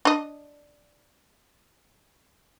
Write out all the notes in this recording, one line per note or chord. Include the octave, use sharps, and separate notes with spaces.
D4 D#5